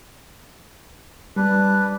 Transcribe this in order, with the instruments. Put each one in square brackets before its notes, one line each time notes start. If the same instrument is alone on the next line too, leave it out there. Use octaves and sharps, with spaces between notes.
[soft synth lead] G3 [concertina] D4 B4